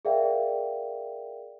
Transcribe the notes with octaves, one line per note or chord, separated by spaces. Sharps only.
G#4 A#4 D5 E5 F5 G5